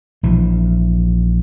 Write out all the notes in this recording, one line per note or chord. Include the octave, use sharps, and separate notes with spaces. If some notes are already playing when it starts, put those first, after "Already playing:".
A#1 E3